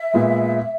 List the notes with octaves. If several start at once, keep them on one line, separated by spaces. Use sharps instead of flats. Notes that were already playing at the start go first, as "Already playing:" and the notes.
Already playing: E5
A#2 G#3 B3